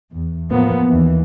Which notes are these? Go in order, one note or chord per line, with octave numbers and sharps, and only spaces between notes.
E2
A2 F3 A#3 B3
D#2 E3